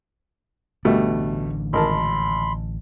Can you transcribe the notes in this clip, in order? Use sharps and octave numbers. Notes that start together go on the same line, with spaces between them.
A1 B2 D3 G3 A3 D4
G#1 A#4 A5 B5 C6